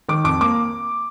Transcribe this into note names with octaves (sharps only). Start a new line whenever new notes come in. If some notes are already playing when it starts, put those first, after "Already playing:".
D#3 D6
F2 D6
A#3 D6